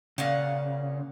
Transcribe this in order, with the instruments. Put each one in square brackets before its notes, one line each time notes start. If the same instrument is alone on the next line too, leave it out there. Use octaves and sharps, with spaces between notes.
[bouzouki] A#2 F5 F#5 [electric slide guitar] C#3